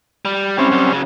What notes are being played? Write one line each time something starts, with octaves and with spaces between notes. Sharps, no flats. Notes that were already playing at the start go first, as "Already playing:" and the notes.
G3
G3 C4 C#4 E4
F#2 G3
C#3 F#3